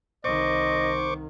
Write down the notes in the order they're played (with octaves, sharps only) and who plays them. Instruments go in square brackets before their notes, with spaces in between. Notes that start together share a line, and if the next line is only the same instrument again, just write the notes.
[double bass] C2 D#3 [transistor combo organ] C5 C#6 D6 [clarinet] D#5